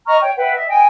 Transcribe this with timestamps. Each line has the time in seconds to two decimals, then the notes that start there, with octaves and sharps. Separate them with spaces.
0.06 D#5 A#5 C#6 F6
0.20 C#5 G5
0.36 B4 E5 F#5 G5
0.53 D#5 E5
0.66 D#5 G5 G#5